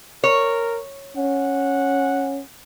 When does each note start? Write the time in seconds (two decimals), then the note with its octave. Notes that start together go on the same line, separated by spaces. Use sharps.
0.24 A#4 C#5
1.17 C#4 F#5